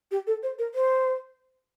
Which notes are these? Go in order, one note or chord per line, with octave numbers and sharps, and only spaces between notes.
G4
A4
C5
A#4
C5